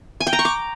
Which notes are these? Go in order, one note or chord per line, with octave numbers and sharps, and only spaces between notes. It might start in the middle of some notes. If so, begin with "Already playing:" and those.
G#5
G5
A#5
C#6
D6